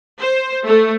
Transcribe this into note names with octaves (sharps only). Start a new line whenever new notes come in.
C5
A3